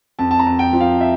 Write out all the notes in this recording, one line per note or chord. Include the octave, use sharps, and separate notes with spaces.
F2 A5
A5
A#5
F2
G5
F3
F5
E5